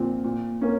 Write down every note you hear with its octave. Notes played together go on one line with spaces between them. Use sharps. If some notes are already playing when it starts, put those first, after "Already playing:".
Already playing: A#2 F3 C4
A#2
A#3 C#4